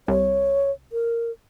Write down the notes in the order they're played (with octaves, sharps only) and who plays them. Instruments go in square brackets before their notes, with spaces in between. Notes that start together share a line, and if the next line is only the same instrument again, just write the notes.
[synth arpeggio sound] C2 [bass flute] C#5
[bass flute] A#4